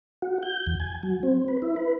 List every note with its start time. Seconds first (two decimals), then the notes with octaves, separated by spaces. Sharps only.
0.22 F#4
0.43 G6
0.67 E2
0.80 G#5
1.03 F#3
1.23 C4
1.48 B4
1.62 E4
1.76 B4